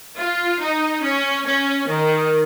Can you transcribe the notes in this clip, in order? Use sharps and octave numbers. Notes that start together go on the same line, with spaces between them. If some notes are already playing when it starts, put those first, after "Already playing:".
F4
D#4
C#4
C#4
D#3